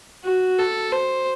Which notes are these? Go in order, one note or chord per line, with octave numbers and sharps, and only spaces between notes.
F#4
A4
C5